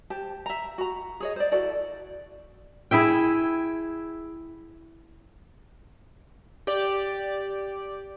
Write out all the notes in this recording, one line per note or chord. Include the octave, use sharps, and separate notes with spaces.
G4 C5 A5
E5 A#5
F#4 A#5
G#4 C#5 D#5
C5 D5
E4 F#4 A4 D5
E4 G#4 E5 G5
G4 D5